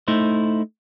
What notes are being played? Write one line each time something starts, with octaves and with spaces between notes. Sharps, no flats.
A3 D#4 E4 C5